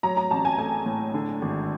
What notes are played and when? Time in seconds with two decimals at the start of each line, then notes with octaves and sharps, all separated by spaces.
0.03 F#3 A#5
0.17 A#5
0.31 A1 A5
0.45 G#5
0.58 A3 G#5
0.86 A2
1.14 D3
1.42 G#1